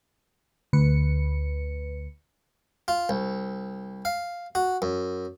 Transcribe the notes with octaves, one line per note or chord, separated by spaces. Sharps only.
D2 B4 C#7
F4
C2
F5
F#4
F#2